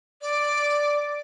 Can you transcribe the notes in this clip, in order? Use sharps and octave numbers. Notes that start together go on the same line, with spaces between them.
D5